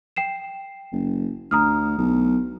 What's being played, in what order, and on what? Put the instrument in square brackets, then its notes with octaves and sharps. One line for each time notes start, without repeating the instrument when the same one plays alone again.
[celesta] G5 C7 E7
[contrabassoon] F#1
[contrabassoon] D2 [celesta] A#5 D#6 F6
[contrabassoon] B1